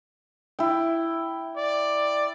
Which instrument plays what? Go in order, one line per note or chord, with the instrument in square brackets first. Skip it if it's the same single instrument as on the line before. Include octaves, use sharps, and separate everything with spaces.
[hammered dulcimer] E4 G5
[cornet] D5